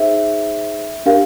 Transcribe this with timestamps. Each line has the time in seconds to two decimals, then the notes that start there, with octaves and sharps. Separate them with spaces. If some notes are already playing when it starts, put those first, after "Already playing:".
Already playing: D#4 G#4 C5 E5
1.06 D4 G4 A#4 F5